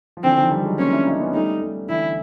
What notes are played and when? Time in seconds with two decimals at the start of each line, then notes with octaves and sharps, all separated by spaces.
0.17 F3
0.24 D3 E3 C4
0.38 D#3 F3
0.52 F3 G3
0.65 F#3 G#3
0.79 A#3 C4 C#4
0.92 D4 E4
1.07 D#4 F4
1.20 B3 C#4
1.34 G3 A3 D#4
1.62 G3 A3
1.89 D3 E3 E4